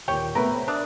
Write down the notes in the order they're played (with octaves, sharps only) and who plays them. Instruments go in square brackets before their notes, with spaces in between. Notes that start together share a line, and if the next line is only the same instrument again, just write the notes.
[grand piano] D#2 A#2 [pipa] G4 C#5 G5
[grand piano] C3 A3 B3 [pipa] A#4 B4
[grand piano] C5 C#5
[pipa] D4 D5 [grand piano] A#4 E5 D#6